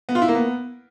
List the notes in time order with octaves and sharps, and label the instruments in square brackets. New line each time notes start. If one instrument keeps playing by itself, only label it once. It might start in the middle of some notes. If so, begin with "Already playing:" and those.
[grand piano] B3
F4
E4
A#3
B3